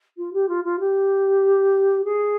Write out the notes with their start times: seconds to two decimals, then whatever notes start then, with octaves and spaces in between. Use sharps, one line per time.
0.17 F4
0.33 G4
0.48 F4
0.64 F4
0.79 G4
2.04 G#4